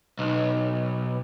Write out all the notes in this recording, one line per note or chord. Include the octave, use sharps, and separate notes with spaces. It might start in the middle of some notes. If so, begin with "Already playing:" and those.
B1